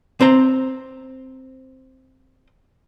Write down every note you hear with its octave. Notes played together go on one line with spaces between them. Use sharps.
C4 C5 A#5